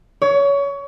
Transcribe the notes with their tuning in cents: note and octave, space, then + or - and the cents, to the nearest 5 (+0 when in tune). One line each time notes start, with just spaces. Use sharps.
C#5 +25